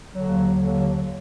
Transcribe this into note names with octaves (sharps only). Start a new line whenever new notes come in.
D#2 D3 F#3
D#2 D3 F#3